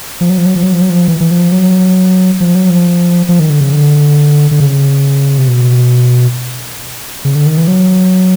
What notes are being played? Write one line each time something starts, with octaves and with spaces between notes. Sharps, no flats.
F3
F#3
F3
F#3
F3
F#3
F3
F#3
F3
E3
E3
F3
F#3
F3
F#3
F3
F3
D#3
D3
C#3
D3
D3
C#3
C3
B2
C#3
D3
D#3
E3
F#3